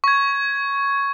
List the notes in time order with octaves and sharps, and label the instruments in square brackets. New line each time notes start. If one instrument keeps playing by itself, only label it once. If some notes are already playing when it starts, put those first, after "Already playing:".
[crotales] C#6 G#6